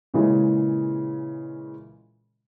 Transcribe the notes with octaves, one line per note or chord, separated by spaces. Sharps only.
A#2 C#3 E3 G#3